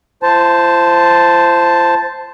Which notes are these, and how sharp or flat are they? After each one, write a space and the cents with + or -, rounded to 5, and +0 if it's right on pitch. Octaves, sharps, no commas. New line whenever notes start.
F4 -45 C5 -5 A5 +0